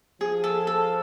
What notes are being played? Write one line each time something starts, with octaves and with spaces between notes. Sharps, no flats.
F3 G#4
A4
A4